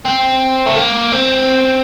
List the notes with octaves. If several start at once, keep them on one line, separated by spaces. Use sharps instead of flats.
C4
A3
A#3
C4